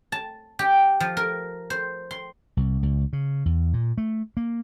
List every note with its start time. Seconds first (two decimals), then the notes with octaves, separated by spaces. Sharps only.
0.12 A5
0.59 G4
1.00 F3
1.17 A#4
1.70 C5
2.11 C6
2.57 C2
2.83 C#2
3.13 C#3
3.46 E2
3.73 A#2
3.98 A3
4.37 A#3